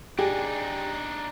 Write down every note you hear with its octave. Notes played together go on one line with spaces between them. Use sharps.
D4 D#4 G4 G#4